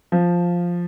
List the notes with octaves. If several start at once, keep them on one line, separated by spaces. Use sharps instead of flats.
F3